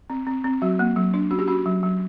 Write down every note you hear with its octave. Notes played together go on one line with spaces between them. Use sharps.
C4
C4
C4
F#3 F#4
A#3
F#3
D4
C#4 F#4
G4
C#4 F#4
F#3
F#3